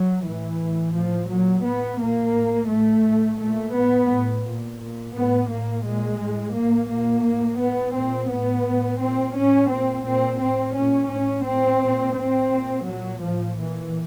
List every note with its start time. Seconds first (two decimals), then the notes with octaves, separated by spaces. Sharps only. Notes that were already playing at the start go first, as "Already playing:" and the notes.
Already playing: F#3
0.24 A2 E3
0.60 A2
0.94 A2 F3
1.30 A#2 F#3
1.65 A2 B3
2.00 A#2 A#3
2.35 A2
2.70 A2 A3
3.05 A2
3.40 A#2 A3
3.75 A2 B3
4.11 A2
4.46 A#2
4.81 A#2
5.16 A2 B3
5.50 A2 A#3
5.85 A#2 G#3
6.21 A2
6.56 A2 A#3
6.91 A#2 A#3
7.27 A2
7.62 A2 B3
7.97 A#2 C4
8.32 A2 B3
8.67 A2
9.02 A#2 C4
9.37 A2 C#4
9.72 A#2 C4
10.07 A#2 C4
10.42 A2 C4
10.77 A#2 C#4
11.12 A2 C#4
11.47 A2 C4
11.83 A#2
12.17 A2 C4
12.53 A#2
12.88 A#2 F#3
13.23 A2 F3
13.58 A#2 E3